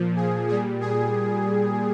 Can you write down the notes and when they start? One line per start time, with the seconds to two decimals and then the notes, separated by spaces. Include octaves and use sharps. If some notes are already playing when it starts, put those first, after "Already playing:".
Already playing: A#2 F3
0.16 G#4
0.48 A#2 G3 G#4
0.81 G#4